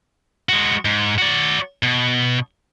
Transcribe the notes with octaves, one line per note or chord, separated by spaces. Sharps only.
G#3 F#4
G#2
F#4 D5
B2